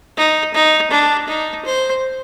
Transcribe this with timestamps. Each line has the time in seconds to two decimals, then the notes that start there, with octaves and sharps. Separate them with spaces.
0.17 D#4
0.54 D#4
0.91 D4
1.28 D#4
1.65 C5